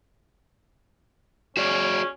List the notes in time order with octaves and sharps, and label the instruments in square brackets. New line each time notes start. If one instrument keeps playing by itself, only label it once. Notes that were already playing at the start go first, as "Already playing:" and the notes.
[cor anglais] C#4 [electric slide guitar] F#4 G#4 D5